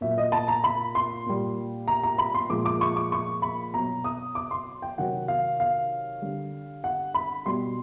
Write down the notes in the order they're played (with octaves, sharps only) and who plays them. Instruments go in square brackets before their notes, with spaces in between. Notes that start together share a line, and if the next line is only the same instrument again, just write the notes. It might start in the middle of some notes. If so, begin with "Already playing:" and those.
[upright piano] A#2 F#3 E5
D#5
A5
A#5
B5
C6
A#2 G3
A#5
A#5
B5
C6
A#2 F3 G#3 D6
D6
C#6
D6
C#6
B5
B2 F#3 A#5
D#6
D6
C6
G5
C3 D#3 F#3 F#5
F5
F5
D3 G3
F#5
B5
B2 G3 C6